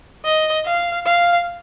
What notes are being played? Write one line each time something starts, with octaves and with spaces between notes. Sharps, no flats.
D#5
F5
F5